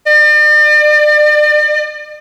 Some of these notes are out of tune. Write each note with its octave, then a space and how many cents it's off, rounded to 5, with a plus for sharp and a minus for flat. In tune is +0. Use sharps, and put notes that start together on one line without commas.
D5 +40